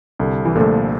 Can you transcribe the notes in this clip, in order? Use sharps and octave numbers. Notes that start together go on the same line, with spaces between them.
C2 D3
E3
A#2 D3 F3 A3